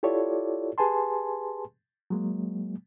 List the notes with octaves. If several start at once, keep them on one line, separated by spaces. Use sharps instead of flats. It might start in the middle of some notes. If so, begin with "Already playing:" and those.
E4 F4 G4 A4 C#5 D5
G4 G#4 B4 G#5 A5 C6
F#3 G#3 A#3